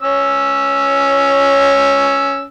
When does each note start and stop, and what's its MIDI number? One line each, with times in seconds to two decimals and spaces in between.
0.02 2.45 61
0.02 2.45 73
0.02 2.45 88